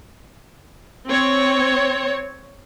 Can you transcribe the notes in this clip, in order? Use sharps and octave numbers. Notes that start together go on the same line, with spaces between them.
C4 C#5